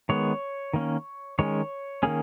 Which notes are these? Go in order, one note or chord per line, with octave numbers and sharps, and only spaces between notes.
D#3 G#3 B3 C#5
D#3 A#3 C#4
D#3 G#3 C#4 C#5
D#3 A#3 C#4 G#4